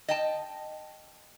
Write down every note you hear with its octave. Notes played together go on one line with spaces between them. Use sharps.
D#5 G5 A5